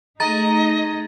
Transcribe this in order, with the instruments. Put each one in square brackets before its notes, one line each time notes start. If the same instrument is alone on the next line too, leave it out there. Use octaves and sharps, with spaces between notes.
[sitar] G#3 [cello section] A3 D#4 [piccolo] D#5 [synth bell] A#5 A6